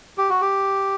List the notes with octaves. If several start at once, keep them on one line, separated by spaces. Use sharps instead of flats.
G4
F#4
G4